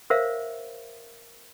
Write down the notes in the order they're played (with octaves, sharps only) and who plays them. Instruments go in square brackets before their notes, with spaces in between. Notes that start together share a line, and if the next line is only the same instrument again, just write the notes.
[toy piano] A#4 C5 C#5 E5 F5